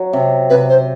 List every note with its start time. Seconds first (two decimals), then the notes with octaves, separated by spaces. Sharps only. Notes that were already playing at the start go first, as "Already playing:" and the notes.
Already playing: F#3
0.13 C3
0.50 C3 B4
0.69 C5